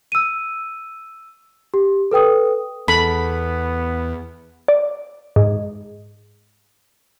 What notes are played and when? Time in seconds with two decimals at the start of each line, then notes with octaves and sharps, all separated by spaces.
0.12 E6 D#7
1.74 G4
2.11 A4 B4 G5 D#6
2.88 E2 B3 A4 B5
4.68 D5
5.36 G#2